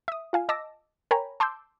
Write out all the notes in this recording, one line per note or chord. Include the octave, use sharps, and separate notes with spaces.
E5 D#6
F4 F5 G#5
D#5 A5 D6 E6 A#6
A#4 C#5 G5 G#5 A#5 B5
A5 C6 D6 E6 G6